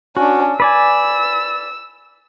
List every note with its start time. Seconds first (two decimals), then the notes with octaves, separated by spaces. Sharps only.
0.17 C#4 D4 F#4
0.60 B4 D5 G#5 E6